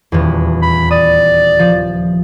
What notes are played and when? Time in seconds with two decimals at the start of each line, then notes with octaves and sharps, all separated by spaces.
0.12 D#1 E2
0.62 B5
0.91 D5 D#6
1.59 F3